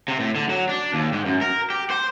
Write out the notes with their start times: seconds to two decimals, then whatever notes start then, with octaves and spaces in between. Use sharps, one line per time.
0.08 C3
0.20 A2
0.36 D3
0.49 F#3
0.69 D4
0.94 D#2
1.13 G#2
1.26 F#2
1.41 A#4
1.70 G4
1.90 C5